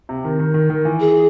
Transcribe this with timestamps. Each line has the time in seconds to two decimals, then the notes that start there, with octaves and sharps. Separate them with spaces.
0.09 C3
0.24 D#3
0.39 D#3
0.54 D#3
0.70 D#3
0.85 E3
1.00 G#4